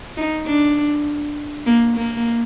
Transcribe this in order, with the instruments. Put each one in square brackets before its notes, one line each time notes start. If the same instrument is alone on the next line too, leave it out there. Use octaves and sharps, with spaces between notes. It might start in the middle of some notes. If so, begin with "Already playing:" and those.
[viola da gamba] D#4
D4
A#3
A#3